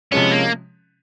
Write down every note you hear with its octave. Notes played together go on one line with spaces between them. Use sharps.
C3 F3 G#3 B3 C#4
A#3